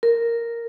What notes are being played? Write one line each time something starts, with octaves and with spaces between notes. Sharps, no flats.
A#4